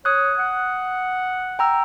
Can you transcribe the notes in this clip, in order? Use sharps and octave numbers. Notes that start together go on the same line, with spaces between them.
C#5 D#6 F#6
F#5
G5 A#5 E6